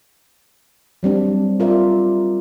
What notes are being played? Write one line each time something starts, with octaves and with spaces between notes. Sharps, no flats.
F#3 G3 C4 D4
F4 A#4 D5 E5